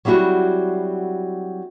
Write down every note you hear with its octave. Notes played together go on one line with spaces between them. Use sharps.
F#3 G3 C4 E4 F#4